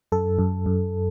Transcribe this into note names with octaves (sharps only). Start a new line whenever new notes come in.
F#2 A4
F#2
F#2